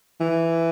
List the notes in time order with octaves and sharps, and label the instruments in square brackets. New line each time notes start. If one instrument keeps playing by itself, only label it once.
[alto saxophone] E3